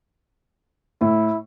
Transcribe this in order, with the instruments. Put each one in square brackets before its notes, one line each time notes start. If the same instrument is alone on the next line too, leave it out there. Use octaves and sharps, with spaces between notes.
[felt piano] A2 [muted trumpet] E4